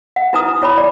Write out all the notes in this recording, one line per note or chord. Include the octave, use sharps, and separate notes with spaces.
F#5
D#4 E4 B4 G#5 A#5 D#6
E4 C#5 G#5 B5 D6
D5